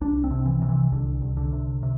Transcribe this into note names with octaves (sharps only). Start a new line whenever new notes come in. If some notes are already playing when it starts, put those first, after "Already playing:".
C2 D4
C4
C3
E3
C3
E3
C2 D3
C2
D3
C3
C3